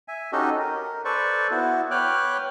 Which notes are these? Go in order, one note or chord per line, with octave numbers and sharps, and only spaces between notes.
E5 G#5
C#4 D#4 F#4 G4 A4 D#5
A#4
A4 B4 C5 D5 C#6
B3 E4 F#4
B4 C#5 G5 D6 F6 F#6